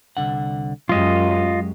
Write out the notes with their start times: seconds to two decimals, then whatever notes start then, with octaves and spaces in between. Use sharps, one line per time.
0.17 C2 D3 F#5
0.89 F#2 F#3 G#3 F4 G4 D#5